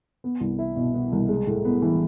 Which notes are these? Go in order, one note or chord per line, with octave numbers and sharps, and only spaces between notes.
B3
C2
E4
B2
B3
C2
G#3
A2
B3
E3